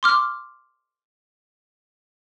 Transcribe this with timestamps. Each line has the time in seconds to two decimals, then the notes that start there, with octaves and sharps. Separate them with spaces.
0.03 C6 D6 F6